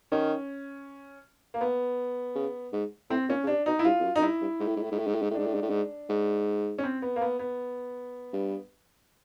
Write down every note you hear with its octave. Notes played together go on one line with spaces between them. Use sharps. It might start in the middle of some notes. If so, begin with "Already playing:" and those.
D#3 C#4
A#3
B3
C#3
G#2
A2 C4
A#2 C#4
C#3
C3 D4
B2 D#4
E4
G2 F4
F2
F#2
F#2 D#4
G2 E4
G2
G#2
A2
G#2
A2
G#2
A2
G#2
A2
G#2
A2
G#2 D4
A2
G#2
A2
G#2
G#2
C#4
C4
B3
A#3
B3
B3
G2